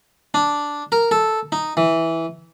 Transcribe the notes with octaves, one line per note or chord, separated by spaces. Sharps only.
D4
A#4
A4
D#4
E3